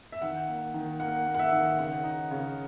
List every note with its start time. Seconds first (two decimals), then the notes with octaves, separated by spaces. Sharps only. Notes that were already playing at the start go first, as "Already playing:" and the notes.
0.12 E5
0.22 D#3 F#5
0.48 A#3
0.74 D#3
1.00 A#3 F#5
1.27 A#3
1.34 F#5
1.39 E5
1.53 D#3
1.78 C#3 F#5
2.04 D#4
2.31 C#3